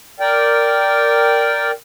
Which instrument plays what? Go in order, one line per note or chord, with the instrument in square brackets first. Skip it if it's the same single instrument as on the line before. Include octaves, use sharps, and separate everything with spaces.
[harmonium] A#4 D5 G5